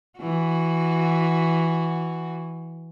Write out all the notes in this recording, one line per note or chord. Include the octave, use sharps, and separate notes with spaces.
E3 F#4